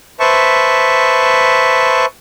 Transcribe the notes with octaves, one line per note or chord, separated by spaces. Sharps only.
B4 C5 E5 A5 C#6